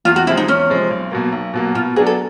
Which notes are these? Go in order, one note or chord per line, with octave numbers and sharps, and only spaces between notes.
E2 F4
F#4
C3 F3 G#3 E4
D#4
E2 C#4
C3 F3 G#3
B1
B2 F#3 A#3
B1
B2 F#3 A#3
B2 F4
F#3 B3 D4 G#4
A4